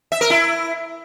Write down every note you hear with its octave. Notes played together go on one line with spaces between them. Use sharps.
E5
A#4
E4